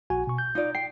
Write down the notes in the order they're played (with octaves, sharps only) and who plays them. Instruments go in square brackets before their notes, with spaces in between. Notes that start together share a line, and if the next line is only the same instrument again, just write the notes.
[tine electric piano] A#1 F#4 G#5
B2 C#6
G6
[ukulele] D#4 F4 D5
[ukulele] G5 [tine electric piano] C7